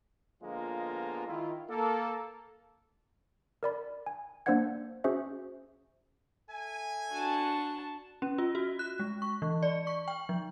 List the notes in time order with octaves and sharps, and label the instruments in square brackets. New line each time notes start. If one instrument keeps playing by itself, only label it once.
[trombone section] D3 F3 G#3 A#3 B3 F4
D#3 E4 F4
A#3 A4
[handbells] A#4 D5 B5
G#5
A#3 D4 C5 D5 F#5 G#6
C#4 F#4 G#4 C5 E5
[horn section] A4 E5 G#5
[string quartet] D4 F#4 A5
[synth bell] C#4
F4
F#4
F#6
G#3
C#6
E3
D5
C#6
G5
F3